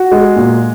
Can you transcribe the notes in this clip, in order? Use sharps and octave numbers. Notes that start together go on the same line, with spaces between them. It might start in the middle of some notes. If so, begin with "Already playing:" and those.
Already playing: F#4
G#3
A#2